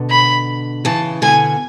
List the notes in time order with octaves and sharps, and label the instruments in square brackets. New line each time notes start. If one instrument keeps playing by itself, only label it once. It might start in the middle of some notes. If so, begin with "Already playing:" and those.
Already playing: [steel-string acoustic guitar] B2 D3
[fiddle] B5
[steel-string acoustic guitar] C#3 E3 [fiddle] A5
[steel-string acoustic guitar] B2 D3 [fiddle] G#5